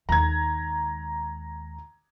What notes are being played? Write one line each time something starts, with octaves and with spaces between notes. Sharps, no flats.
D#2 G#3 A#5 G#6